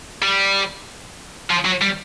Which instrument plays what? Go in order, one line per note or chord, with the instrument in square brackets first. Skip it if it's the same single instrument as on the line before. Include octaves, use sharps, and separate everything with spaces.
[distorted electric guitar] G3
F3
F#3
G3